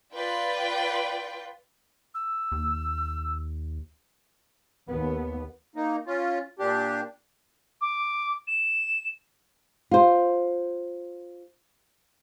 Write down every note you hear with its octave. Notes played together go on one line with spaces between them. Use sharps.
F4 B4 D5 G5
E6
D#2
D#2 B3
A#3 D#4
C#4 F4
A#2 D4 G4
D6
E7
F4 C5